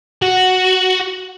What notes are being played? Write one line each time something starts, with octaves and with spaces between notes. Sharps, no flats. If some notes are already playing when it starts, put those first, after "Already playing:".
F#4